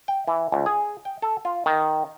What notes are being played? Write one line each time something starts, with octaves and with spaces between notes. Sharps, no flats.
G5
E3
C#2
G#4
G5
A4
F4
D#3